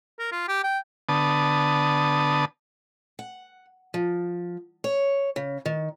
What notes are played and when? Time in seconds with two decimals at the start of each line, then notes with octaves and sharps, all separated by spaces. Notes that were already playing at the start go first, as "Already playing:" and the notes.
0.19 A#4
0.32 F4
0.48 G4
0.64 G5
1.09 D3 B3 A5 D#6
3.19 F#5
3.94 F3
4.84 C#5
5.36 C#3
5.66 D#3